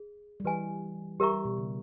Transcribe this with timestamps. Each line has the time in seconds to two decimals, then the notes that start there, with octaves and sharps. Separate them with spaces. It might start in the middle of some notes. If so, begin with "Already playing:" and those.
Already playing: G#4
0.40 G3
0.44 E3 G4 B4 D#5 G#5
1.20 G3 G4 A#4 E5 A#5 C#6
1.33 G3
1.45 B2
1.58 C#3